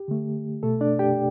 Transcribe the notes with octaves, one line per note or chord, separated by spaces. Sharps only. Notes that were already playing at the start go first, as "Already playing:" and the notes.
Already playing: G4
D3 A3
B2 A3 A4
D4 D5
G4 G5